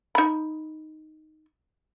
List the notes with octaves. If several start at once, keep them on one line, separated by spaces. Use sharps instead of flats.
D#4 B5